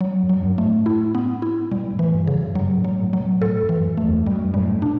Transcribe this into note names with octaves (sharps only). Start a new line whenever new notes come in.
F#3
F#2
F#3
G2
A3
A2
E4
B3
E4
B2 G3
A2
E3
G2
C#3
F#2
G2 F#3
A2
F#3
A2
F#3
B2
A2 A4
F#2
E3
F#2
A3
E2
F#2 G3
A2 G3
B2 D4